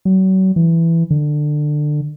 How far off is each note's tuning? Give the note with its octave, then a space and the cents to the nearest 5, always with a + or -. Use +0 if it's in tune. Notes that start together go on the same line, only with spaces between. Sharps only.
F#3 +35
E3 +10
D3 +20